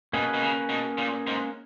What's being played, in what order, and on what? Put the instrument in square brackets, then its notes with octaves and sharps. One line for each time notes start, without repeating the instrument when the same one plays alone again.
[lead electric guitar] B2 [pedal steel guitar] A#3 C#4 G#4 B4
[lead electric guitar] B2
C#3
B2
A#2
G#2